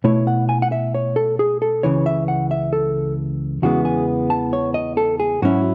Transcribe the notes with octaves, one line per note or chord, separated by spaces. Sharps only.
B2 A3 E4 C#5
F#5
G#5
F#5
E5
C#5
A4
G#4
A4
C#2 C#3 E3 C#5
E5
F#5
E5
A4
E2 C#3 E3 G#3 B3 F#4
G#4
A5
C#5
D#5
A4
G#4
G#2 F#3 C#4 E4 F#4